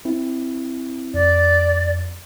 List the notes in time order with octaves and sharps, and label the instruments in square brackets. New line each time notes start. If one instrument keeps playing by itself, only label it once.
[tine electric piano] C4 E4
[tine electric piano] F2 [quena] D5